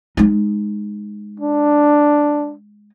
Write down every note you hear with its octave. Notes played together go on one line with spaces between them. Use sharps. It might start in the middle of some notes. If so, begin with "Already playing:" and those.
G#3 D#4
D4